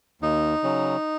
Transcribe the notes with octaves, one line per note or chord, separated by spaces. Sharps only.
D#2 D#4
C#3 F#3